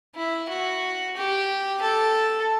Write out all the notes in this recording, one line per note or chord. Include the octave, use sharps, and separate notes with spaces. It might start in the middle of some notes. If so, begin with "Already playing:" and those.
E4
F#4
G4
A4